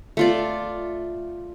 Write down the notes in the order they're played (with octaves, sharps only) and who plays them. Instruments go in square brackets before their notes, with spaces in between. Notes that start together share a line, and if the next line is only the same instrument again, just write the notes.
[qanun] A3 F4 D5